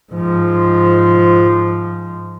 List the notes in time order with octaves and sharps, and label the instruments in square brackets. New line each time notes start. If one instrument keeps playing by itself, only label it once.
[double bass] G#2 F3